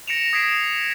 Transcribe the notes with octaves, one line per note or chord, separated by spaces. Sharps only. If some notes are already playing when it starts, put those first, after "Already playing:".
A#6 C#7 D7 E7 F7
D#6 G#6 B6 C7 D7 E7